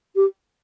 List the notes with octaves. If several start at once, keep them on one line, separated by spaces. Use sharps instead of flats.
G4